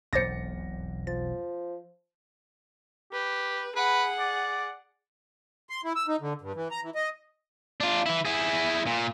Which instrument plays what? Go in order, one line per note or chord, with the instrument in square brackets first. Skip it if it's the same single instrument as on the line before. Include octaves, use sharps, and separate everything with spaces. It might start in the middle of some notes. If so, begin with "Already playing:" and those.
[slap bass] E1 B1 F2 [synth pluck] C5 D6 A6 [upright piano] A#6 C#7
[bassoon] F3 [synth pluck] A6
[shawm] G4 [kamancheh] B4
[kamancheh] G#4 F#5 [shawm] B4
[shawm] D5
[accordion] C6
E4
E6
D#4
D3
G2
E3
A#5
E3
D#5
[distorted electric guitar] D4 F4
E3 E4
E4 G#4
A#2